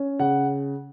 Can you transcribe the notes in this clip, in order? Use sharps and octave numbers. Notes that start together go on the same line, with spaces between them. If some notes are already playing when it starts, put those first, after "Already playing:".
Already playing: C#4
C#3 F#5